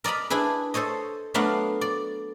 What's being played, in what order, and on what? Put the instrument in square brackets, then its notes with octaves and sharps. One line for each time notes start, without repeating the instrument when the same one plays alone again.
[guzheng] A#4 D5 D#5 A#5 B5
D4 E4 G#4 B4
A4 C5 C#5 D#5
F#3 A3 B3 D4 A#4 F5
D5